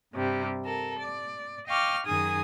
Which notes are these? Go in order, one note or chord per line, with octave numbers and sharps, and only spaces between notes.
G2 C3 G3
A4 A#4
D5
D#5 F5 G5 C#6 D6 F6
F#2 D#3 G#4 G#5 D#6